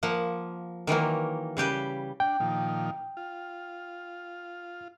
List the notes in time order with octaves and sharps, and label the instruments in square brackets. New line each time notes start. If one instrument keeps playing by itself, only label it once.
[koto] F3 A#3 F#5
D#3 E3 F#3 A#3
C#3 G3 G4 B4
[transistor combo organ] D4 [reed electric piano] G5
[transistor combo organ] A#2 D#3 F3
F4